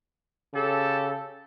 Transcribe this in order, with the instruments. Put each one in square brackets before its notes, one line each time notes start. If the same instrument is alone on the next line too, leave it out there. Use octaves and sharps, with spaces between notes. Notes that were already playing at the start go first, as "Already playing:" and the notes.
[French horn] C#3 [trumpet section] G4 A4